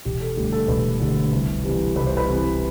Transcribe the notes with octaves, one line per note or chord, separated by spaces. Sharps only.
E1 G4
A4
D2 D3 G3 G4
A4
E1 B4
D2 D3 G3
C2
C3 E3 G3
C2 B4
C5
B4
C3 E3 G3